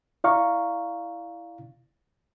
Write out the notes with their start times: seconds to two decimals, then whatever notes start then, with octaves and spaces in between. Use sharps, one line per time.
0.24 E4 D5 F5 A#5 C#6